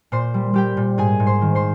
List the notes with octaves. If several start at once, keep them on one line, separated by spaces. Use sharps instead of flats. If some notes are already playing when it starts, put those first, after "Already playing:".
A#2 C5 C6
G3
G3 G4 G5
A#2
G#2 G#4 G#5
G#2
C5 C6
D#3
C5 C6